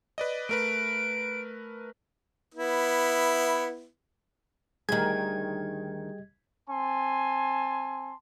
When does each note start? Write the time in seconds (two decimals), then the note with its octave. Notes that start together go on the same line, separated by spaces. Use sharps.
0.18 B4 D5 D#5
0.49 A3 A#4 B4 D7
2.54 B3 E4
4.89 D2 D#3 G3 G4 G#4 D#5 G5 G#6
6.68 C4 G#5 A5 C6